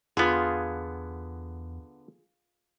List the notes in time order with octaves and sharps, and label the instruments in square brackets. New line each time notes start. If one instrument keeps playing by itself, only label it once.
[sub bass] E2 [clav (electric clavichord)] D3 B3 [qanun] F4 G#4